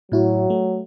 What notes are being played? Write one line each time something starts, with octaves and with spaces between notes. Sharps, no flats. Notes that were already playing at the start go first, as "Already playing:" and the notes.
A2 F#3 E4 F#4
A3